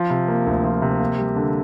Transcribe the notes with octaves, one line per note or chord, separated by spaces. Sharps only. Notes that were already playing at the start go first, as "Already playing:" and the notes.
Already playing: F3
C3
A#3
D2
F3
C3
A#3
G3
D3